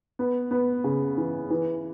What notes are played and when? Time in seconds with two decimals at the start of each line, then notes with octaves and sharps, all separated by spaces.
0.19 B3
0.51 B3
0.84 C#3
1.17 E3
1.50 E3